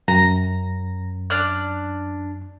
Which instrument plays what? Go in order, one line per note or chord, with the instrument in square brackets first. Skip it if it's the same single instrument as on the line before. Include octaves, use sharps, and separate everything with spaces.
[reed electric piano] F#2 [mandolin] A#5
[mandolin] D4 F6 F#6